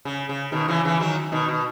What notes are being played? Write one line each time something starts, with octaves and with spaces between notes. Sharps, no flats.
C#3
C#3
B2 D#3
C#3 E3
C#3 E3
D#3 F#3
B2 D#3
B2